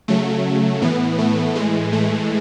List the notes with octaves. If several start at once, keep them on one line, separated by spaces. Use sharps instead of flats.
C#3 F#3 A3
A2 E3 B3
A3
A2 E3 G#3
A3